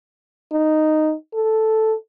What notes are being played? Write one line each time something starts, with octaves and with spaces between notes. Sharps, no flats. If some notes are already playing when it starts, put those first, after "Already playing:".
D#4
A4